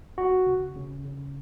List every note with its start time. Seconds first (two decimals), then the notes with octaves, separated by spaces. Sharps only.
0.18 D2 F#4
0.46 C#3
0.76 C#3
1.05 C#3